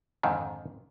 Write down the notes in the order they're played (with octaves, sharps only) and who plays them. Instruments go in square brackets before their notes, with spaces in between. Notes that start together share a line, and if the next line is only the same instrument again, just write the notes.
[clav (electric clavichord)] F2 G#2 D3 D#3